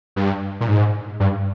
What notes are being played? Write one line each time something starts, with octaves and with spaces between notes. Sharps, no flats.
G2
A#2
G#2
G2